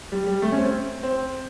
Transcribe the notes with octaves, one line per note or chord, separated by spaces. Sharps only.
G3
G3
A3
C#4
C4
C4